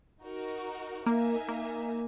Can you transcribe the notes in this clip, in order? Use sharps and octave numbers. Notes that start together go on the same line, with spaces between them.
D#4 F#4 A#4
A#3 D#4 A#4 E5 G#5
A#3